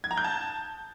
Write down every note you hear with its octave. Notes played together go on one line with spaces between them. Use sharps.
G#6
A#5
G6
A5